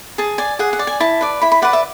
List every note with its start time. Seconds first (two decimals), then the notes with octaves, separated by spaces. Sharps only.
0.18 G#4 A5
0.38 D5 G#5
0.59 G#4 F#5
0.73 F#5
0.79 D5
0.87 G#5
1.00 E4 A5
1.21 B4 D5
1.42 E4 B5
1.52 B5
1.62 B4 D5 F#5
1.73 E5